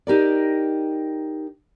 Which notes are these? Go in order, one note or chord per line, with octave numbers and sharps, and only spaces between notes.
D#4 G4 A#4 D5